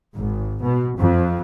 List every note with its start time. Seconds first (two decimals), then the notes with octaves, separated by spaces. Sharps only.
0.15 G#1
0.63 B2
0.98 F2